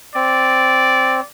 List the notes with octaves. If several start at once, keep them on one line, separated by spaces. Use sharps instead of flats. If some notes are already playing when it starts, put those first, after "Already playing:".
C4 D5